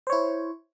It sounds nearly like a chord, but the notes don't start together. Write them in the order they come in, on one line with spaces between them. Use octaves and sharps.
C5 C#5 E4